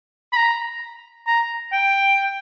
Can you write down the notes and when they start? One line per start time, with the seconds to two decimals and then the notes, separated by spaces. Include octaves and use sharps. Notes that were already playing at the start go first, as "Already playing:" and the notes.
0.33 B5
0.36 A#5
1.27 A#5
1.72 G5